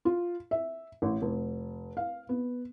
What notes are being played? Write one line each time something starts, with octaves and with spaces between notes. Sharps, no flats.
F4
E5
A1
F1
F5
B3